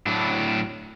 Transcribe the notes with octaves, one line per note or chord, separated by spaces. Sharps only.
A2 F#3 D4